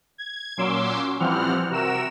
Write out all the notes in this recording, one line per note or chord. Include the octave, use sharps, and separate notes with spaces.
G#6
A#2 F#3 C#4 C6 D6 E6
E3 F3 G3 C4 F#5 F6
C3 F#4 A#4 E6 E7